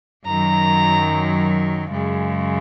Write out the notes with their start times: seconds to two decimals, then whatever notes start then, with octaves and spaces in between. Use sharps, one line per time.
0.25 F#2 D#3 F#3 A#5
1.91 F#2 C#3 G#3